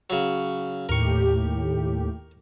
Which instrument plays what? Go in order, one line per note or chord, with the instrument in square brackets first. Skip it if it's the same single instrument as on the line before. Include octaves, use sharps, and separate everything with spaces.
[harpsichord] C#3 F#3
[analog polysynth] D#2 A2 G4 [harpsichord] A#4 C#6